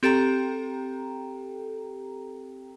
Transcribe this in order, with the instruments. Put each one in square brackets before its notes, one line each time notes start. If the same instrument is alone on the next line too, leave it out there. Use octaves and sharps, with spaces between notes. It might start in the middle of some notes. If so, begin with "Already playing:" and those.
[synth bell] C4 G4 A4 G5 A#5